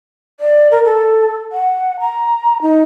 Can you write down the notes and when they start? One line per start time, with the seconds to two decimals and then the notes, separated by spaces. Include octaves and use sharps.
0.40 D5
0.71 A#4
0.85 A4
1.52 F#5
2.00 A#5
2.62 D#4